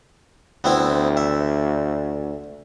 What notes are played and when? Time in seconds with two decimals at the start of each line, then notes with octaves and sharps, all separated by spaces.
0.64 D2 B3 C4 E4
1.17 E5